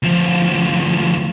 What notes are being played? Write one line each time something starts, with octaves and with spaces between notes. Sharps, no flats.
D2 F3